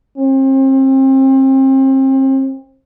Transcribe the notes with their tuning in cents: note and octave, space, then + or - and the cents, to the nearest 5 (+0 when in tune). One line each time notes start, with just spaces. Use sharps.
C4 +35